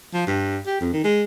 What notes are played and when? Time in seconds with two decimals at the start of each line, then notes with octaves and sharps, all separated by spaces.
0.14 F3
0.27 G2
0.67 G4
0.81 F2
0.93 D#3
1.04 G#3